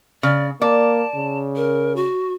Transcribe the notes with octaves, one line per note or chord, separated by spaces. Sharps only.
C#3 D5
A#3 D5 A5
C#3
A#4
F#4